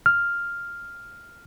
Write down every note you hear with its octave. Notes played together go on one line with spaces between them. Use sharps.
F6